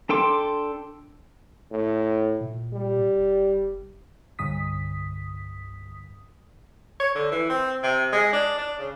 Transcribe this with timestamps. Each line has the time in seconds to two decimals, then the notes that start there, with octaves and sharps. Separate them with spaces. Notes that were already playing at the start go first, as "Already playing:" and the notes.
0.09 D4 A4 G5 C6 D6
1.71 A2
2.41 A#2
2.73 G3
3.15 F1
4.39 C2 G2 D3 D#6 B6
7.00 C#5
7.15 D3
7.32 E3
7.50 C4
7.83 C3
8.12 G#3
8.33 D4
8.58 D4
8.79 C#3